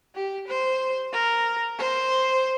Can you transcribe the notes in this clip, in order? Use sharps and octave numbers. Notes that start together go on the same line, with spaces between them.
G4
C5
A#4
C5